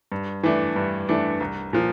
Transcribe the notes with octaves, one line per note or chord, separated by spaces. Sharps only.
G2
E3 A3 D4
G2
E3 A3 D4
C2
A#2 F3